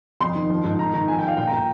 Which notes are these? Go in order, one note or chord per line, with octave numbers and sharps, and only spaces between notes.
F2 C6
D#3
F3
G#2
D#3 A#5
D#3 A#5
F3 G#5
G5
F3 F5
A#2 G5
A#5
A#2 G5